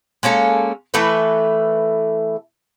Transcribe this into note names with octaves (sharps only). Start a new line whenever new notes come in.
G#3 A#3 C#4 A4
E3 A3 A4 B4